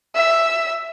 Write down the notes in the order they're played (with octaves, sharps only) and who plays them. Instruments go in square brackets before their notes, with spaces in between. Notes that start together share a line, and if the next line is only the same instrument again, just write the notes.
[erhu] E5